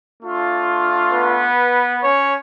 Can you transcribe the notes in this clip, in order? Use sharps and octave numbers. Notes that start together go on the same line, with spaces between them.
A3 D4 F4
B3 B4
C#4 C#5